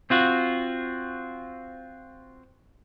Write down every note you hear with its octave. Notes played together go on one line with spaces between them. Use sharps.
C4 F4 F#4